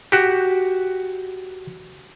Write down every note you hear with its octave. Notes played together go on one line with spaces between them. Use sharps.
F#4 G4